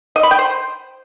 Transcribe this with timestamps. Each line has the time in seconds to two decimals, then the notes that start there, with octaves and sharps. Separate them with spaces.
0.16 D#5
0.23 B5
0.31 G5
0.39 C5